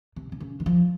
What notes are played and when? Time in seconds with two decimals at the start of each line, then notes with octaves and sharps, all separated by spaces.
0.16 C3
0.32 C3
0.40 C#3
0.60 D#3
0.66 F3